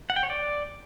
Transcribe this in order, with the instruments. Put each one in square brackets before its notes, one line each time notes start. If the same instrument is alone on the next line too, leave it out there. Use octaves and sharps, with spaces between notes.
[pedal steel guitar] F#5
G5
C#5
D5